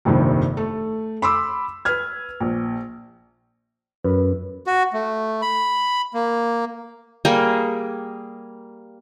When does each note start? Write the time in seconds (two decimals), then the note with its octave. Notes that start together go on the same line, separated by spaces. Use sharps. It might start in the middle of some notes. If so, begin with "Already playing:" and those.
0.05 F1 A#1 G2 C3 D#3
0.57 A3 A4
1.22 B5 C6 D6 E6
1.85 B4 F6 G#6
2.40 A#1
4.04 F#2 B4
4.67 F#4
4.93 A3
5.42 B5
6.14 A#3
7.25 G3 A#3 G#4